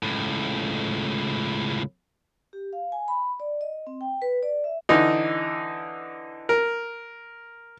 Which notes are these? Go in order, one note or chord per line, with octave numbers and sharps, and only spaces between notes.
C#2 A2
G4
F5
G#5
B5
D5
D#5
C4
G5
B4
D5
E5
D3 E3 D#4
A#4